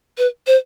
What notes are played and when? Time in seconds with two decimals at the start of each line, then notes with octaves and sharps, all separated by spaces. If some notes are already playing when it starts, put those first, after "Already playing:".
0.18 B4
0.47 C5